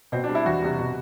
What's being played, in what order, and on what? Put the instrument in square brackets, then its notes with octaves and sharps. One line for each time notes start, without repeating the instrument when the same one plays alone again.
[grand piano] B2 C4
D4
G3
E4
E2 F#4
C3 G3
B2